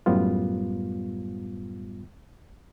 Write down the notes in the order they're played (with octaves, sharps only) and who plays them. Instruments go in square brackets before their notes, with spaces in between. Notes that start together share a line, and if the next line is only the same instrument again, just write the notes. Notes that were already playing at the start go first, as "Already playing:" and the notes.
[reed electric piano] F#2 A2 G3 B3 F4